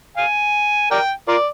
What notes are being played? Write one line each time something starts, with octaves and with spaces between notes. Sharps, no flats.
F5 G#5
A#4 D5 G5
F4 A#4 D5